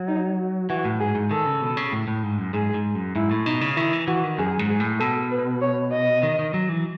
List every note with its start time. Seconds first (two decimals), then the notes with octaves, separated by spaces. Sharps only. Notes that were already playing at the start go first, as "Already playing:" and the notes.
Already playing: F#3
0.08 D#4
0.70 E3 F#4
0.85 A2
1.00 G#2 G#4
1.15 G#2
1.31 D#3 A4
1.46 C#3
1.62 B2
1.77 C#3
1.92 A2
2.08 A2
2.23 G#2
2.38 F#2
2.54 G#2 G#4
2.74 G#2
2.95 F#2
3.16 G#2 E4
3.31 A2
3.46 B2 D#4
3.61 C#3
3.77 D#3 E4
3.93 E3
4.07 E3 F#4
4.24 D#3
4.39 F#2 G#4
4.59 G#2
4.69 G#4
4.80 A2
5.00 B2 A4
5.31 B4
5.61 C#5
5.92 D#5
6.23 D#3
6.39 D#3
6.54 F#3
6.69 E3